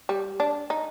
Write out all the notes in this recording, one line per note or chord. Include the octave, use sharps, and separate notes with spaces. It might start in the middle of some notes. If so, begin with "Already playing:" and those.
G3
D4
D#4